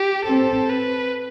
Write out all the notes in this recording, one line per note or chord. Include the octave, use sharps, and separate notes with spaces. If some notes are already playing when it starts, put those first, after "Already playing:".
Already playing: G4
C4 A4
B4